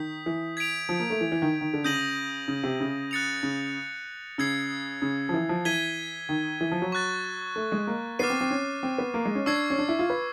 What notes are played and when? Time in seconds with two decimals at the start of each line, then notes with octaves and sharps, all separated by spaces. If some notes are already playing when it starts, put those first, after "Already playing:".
Already playing: D#3 D#6 G6 B6
0.26 E3
0.57 G#6 B6 D7 F7
0.89 F3
1.00 A#3
1.10 A3
1.21 E3
1.32 E3
1.42 D#3
1.61 D#3
1.73 D3
1.84 C#3 D#6 G6 A#6 D#7 F#7
2.48 C#3
2.63 C3
2.80 C#3
3.11 F#6 A6 C#7 F7
3.43 C#3
4.38 C#3 E6 G#6 C7
5.02 C#3
5.29 F3
5.34 E3
5.49 F3
5.65 E3 G#6 B6 D#7 G7
6.29 D#3
6.61 E3
6.72 F3
6.82 F#3
6.92 C#6 F#6 A6
7.56 A3
7.72 G#3
7.87 A#3
8.19 B3 D6 F6 A6 C7 D#7
8.30 C4
8.41 C4
8.51 C#4
8.83 C4
8.98 B3
9.14 A#3
9.25 G#3
9.35 C#4
9.46 D4 C#6 E6 G#6 C7
9.70 C#4
9.79 D4
9.89 E4
9.99 F4
10.10 B4